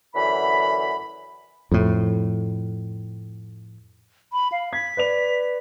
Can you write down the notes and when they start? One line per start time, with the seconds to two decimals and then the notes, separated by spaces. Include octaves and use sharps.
0.14 F#2 D3 E3 B5
1.71 F2 A2
4.33 B5
4.52 F5
4.73 G#6 B6
4.97 B4 D5 F7